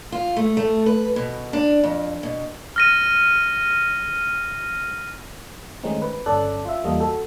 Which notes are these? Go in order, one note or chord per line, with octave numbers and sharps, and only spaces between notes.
F4
A3
A3
B4
B2
D4
F2
B2
F6 A#6 D#7
D#3 G#3 A3 C4 C#4 D#4
B4
G1 C#4 A4 D5 F#6
F4 E5
E2 G3 A#3 F4 A4 D#5
F#4 A4